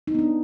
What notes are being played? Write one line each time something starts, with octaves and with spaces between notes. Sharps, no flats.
D#4
B3
D4